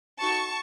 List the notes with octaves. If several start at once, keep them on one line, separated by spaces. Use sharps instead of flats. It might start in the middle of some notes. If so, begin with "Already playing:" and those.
D#4 F#4 A4 A5 C#6